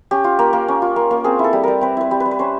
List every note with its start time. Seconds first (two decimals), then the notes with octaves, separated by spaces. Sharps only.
0.11 C#4 G4
0.24 F4
0.39 A#3
0.53 A#3
0.68 C#4
0.82 F4
0.96 A#3
1.11 A#3
1.24 C4 G#4
1.39 E4
1.44 A4
1.53 G3
1.63 G3 A#4
1.81 C4 B4
1.97 E4 B4
2.11 G3
2.20 B4
2.25 G3
2.31 B4
2.39 C#4 C5